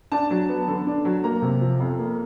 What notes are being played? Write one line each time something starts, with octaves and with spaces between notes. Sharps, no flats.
D4 A5
F#3
B3
D3
D4
F#3
A#3 A#5
C3
F3
F2
A#3